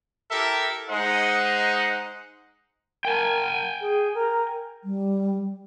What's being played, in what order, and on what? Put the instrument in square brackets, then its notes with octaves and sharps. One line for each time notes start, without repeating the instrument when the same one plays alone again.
[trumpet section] E4 G4 A4 A#4 E5
G#3 D#4 C5 D#5 F#5
[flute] A#4 [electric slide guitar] G5 G#5
[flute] G#4
A#4
[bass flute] G3